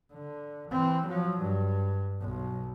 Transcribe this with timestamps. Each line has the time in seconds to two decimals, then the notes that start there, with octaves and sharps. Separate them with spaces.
0.13 D3
0.71 E3 C4
1.08 F3 F#3
1.42 G2
2.20 B1